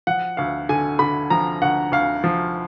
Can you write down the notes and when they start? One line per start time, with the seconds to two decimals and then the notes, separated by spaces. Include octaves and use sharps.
0.07 F3 F#5
0.37 D2 F5
0.69 D3 G#5
0.99 D3 B5
1.30 F3 A#5
1.62 D2 F#5
1.92 D2 F5
2.24 F3